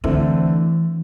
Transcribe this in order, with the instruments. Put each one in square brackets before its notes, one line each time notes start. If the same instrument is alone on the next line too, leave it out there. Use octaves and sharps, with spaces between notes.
[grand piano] D3 A3 C4 E4 [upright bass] E3